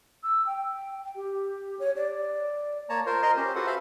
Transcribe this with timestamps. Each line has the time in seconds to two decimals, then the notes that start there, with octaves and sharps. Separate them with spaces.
0.24 E6
0.47 G5
1.15 G4
1.79 C#5
1.96 D5
2.89 A#3 C#5 A5 A#5
3.06 F4 A#4 C5
3.22 A#4 D#5 A#5 C6
3.37 C#4 G4 C5
3.55 F4 F#4 A4 B4 F#5
3.67 C5 E5 F5 B5 C6